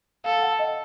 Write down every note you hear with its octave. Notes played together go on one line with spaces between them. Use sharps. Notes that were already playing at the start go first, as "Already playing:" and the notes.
A4 F5
F#5
D#5